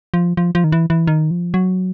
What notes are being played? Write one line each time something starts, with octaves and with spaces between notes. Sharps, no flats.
F3
F3
F3
D#3
E3
E3
D#3
F3
F#3